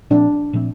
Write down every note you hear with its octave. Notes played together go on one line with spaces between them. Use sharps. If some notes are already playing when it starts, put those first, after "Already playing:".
A#2 F3 A3 C4 D4
A#2 F3 A3 C4